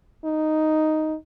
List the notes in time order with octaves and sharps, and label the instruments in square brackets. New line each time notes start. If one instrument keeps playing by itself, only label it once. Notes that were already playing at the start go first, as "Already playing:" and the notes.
[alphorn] D#4